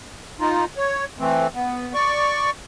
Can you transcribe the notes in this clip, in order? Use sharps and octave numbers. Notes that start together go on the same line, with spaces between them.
D#4 F4
C#5
E3 A3 C4
B3
D5 C#6